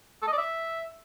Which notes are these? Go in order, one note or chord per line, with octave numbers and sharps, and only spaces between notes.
A4
D#5
D5
E5